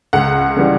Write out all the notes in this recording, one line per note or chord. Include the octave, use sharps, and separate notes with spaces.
C#2 F#5
C#3 E3 G3